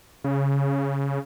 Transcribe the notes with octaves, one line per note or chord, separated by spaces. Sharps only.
C#3